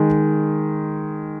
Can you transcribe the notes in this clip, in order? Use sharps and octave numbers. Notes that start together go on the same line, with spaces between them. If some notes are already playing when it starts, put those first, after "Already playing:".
Already playing: D#3 G#3